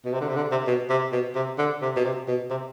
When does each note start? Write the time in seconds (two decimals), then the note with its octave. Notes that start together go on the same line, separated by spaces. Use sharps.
0.05 B2
0.13 C3
0.20 D3
0.28 C3
0.36 D3
0.51 C3
0.67 B2
0.89 C3
1.12 B2
1.35 C3
1.58 D3
1.82 C3
1.96 B2
2.04 C3
2.28 B2
2.50 C3